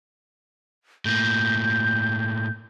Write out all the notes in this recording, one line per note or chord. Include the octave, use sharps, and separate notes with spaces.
A2 A#3 G6